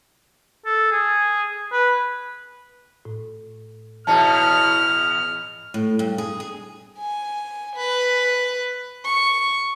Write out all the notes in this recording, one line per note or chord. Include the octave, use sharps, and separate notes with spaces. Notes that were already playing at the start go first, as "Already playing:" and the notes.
A4
G#4
B4
A2
E2 B2 C#4 A5 F6
A2
G2
G#4
G#4
G#5
B4
C#6